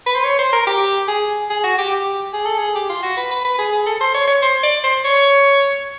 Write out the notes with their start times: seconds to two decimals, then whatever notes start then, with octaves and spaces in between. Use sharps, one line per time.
0.06 B4
0.15 C5
0.24 C#5
0.39 C5
0.53 A#4
0.67 G4
1.08 G#4
1.50 G#4
1.64 F#4
1.78 G4
1.91 G4
2.33 G#4
2.46 A4
2.58 G#4
2.75 G4
2.89 F4
3.03 F#4
3.17 B4
3.31 B4
3.45 B4
3.59 G#4
3.72 G#4
3.86 A4
4.01 C5
4.15 C#5
4.27 C#5
4.43 C5
4.63 D5
4.84 C5
5.05 C#5